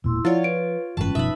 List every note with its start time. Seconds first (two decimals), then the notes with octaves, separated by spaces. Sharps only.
0.04 E1 A#2 E4 C6 E6
0.25 F3 E4 F4 C#5 D5 F#5
0.44 B4 D7
0.97 F#1 G#2 E3 G3 C#4 B4 A5
1.15 F#1 B2 F3 D#4 E5 B5